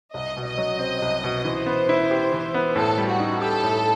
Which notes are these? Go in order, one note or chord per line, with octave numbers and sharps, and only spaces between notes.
C2 D#5
B2
D#5
F#3
C4
C2
B2
E3 C5
B3
E4
G4
E3
B3
A2 A4
G3
F#4
D#4
G4 A4
A2